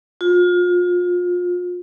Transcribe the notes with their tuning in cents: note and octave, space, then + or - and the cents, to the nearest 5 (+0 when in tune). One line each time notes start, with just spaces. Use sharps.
F4 +30